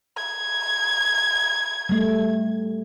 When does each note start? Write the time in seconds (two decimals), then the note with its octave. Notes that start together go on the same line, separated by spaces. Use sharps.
0.17 G#6
1.89 G3 A3